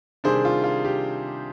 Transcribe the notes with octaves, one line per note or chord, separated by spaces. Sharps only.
C3 D#3 G3 D4 G#4 C5
F4
F4
G4